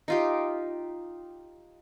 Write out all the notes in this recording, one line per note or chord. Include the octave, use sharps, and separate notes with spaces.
D#4 F4 G4